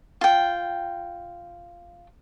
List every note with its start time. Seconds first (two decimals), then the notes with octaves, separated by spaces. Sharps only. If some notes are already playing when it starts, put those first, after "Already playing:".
0.21 F4 G5